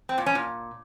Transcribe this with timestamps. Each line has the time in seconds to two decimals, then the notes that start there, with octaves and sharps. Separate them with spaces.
0.09 C4
0.18 A#2
0.26 C#4
0.35 A#2